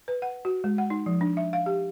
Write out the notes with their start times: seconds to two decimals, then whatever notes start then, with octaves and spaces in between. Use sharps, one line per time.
0.08 B4
0.22 F#5
0.45 F#4
0.64 G#3
0.78 F#5
0.90 D#4
1.06 F3
1.21 D4
1.37 E5
1.53 F5
1.66 G4